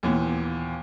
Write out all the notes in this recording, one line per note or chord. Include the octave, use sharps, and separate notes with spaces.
D#2 A#2 E3 B3